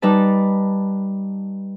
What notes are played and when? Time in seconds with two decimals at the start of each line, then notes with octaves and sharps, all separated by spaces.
0.02 G3 D#4 B4 A5